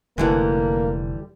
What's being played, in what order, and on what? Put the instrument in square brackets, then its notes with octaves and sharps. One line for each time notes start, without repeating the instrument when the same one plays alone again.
[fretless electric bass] F1 A3 [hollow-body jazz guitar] D3 E3 G3 [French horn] A#3